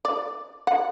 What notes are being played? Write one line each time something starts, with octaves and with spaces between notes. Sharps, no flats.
D5
F#5